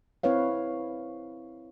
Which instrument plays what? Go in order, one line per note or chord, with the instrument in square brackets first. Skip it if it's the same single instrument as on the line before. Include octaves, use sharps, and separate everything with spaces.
[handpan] C4 E4 B4 C#5 F5